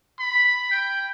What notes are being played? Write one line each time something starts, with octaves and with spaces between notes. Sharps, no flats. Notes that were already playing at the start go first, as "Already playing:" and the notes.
B5
G5